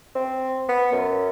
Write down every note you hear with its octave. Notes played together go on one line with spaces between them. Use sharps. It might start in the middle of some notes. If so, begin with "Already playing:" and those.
C4
B3
F#2